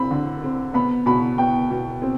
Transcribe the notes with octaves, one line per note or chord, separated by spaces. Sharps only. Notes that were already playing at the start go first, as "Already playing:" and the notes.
Already playing: C4 B5
D3
C4
B3 B5
B2 B5
B3 G5
B2
C4